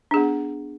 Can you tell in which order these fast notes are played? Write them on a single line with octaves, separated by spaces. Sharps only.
D4 G#4 B3